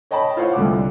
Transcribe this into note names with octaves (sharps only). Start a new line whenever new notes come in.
C#5 D#5 G5 A5 B5
E4 F4 C5 C#5 F5 F#5
C2 D3 F4 D6